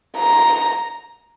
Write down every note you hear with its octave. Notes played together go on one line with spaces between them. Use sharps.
A#5